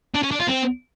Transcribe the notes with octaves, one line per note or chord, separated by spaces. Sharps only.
D4
C#4
D4
F4
C4